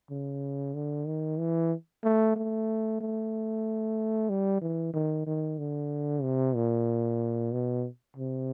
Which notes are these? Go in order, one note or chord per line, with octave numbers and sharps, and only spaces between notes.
C#3
D3
D#3
E3
A3
A3
A3
G3
E3
D#3
D#3
D3
C3
A#2
B2
C3